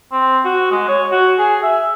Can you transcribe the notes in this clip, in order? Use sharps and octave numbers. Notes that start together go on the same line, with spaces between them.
C4
F#4
G#3
C#5
F#4
G#4
E5